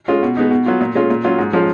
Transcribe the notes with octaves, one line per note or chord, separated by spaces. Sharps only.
G#3 C#4 F4
B2
G#3 B3 D#4
B2
F#3 B3 F4
A#2
G#3 C#4 F4
A#2
F#3 C#4 F4
G#2
F3 G#3 C#4 F4